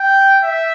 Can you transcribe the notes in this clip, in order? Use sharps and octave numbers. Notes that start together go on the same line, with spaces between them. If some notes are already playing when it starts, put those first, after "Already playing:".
Already playing: G5
E5